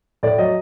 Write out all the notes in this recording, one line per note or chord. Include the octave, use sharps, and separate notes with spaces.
A2 D5
F#3 D#5